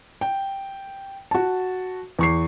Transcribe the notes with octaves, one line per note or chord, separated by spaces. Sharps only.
G5
F#4 A5
E2 C#6 C7